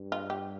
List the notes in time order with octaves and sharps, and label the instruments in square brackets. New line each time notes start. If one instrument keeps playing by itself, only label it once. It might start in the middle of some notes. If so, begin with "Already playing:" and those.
Already playing: [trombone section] G2
[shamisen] F4
G4